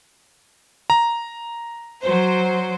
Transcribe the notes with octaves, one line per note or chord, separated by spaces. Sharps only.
A#5
F#3 C5